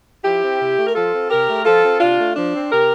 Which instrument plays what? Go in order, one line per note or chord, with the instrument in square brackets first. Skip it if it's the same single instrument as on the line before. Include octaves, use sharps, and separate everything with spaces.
[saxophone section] F3 E4 G4
C4
C3
A3
A#4
F3 F4 A4
C4
C3 G4 A#4
A3
F3 F4 A4
C4
C3 D4 F4
A3
F3 D4
C4
C3 G4 A#4